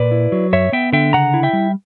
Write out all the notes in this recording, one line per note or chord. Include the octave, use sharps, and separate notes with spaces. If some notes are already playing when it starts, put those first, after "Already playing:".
Already playing: A#2 B4 D5
E4
F#3
F#2 C#5 E5
B3 E5 G5
D3 E5 G5
C#3 F#5 A#5
E4
E5 G5
G3